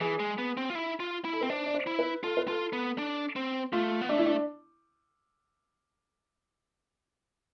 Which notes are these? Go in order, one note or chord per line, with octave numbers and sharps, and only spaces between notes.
E3 G#4
G#3
B3
C4
F4
E4
F4
E4
A4
C4 B4
D4 C5
D5
C5
E4
B4
F4 A4
B4
F4 A4
B3
D4
C4
A3 F4
B3
A3 D4
E4
D4